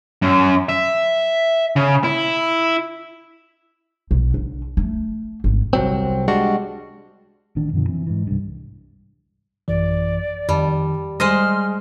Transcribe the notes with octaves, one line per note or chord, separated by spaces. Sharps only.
F#2
E5
C#3
E4
B1
D3
A3
G#1
C2 F#3 C4
G3 G#3 D4 F#4
A1 D#3 D4
F#2 B2 D3 F3
E3 C4
G#2 E3
C2 G2
A1 F#2 E3 D5
F2 D#3 G3 A5
G3 G#3 C5 D#5 D#6 F6